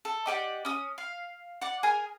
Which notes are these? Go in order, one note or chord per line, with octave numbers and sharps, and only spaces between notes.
A4
D#4 G4 D5 F#5
C#4 D#6
F5
D5 F#5
G#4 A#4 G#5